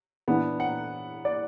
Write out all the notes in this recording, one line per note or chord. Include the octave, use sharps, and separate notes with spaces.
E3 B3 D4
F#5
D5